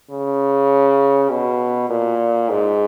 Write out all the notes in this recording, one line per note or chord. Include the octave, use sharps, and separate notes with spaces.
C#3
B2
A#2
G#2